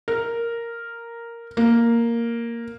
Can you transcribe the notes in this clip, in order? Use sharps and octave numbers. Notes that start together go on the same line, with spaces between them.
A#4
A#3